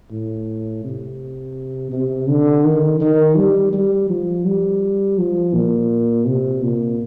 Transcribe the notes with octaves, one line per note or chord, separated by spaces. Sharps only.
A2
C3
C3
D3
D#3
D#3
G3
G3
F3
G3
F3
A#2
C3
A#2